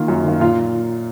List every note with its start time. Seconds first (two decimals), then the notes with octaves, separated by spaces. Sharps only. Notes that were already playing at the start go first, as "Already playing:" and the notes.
Already playing: D#3 A#3 F4
0.08 F#2
0.24 D#3 A#3
0.40 A#2 F4